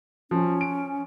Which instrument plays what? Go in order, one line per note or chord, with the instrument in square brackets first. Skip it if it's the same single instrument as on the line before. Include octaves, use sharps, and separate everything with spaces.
[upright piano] F3 [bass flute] C#4
[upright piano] D7